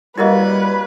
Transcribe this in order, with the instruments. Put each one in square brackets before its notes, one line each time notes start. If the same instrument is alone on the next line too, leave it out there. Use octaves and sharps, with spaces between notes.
[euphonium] G3 [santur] A#3 F#4 C#5 [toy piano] E4 A#4 D#5 [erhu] B4